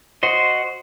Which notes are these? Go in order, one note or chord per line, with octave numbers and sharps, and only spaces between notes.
F#4 C5 D#5